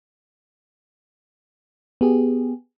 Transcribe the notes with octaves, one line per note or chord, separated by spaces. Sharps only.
B3 G4 G#4